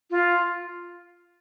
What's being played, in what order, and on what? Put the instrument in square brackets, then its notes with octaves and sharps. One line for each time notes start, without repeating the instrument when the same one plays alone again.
[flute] F4